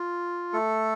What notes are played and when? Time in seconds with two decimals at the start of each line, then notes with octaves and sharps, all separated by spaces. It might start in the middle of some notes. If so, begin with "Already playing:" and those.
Already playing: F4
0.53 A3 A4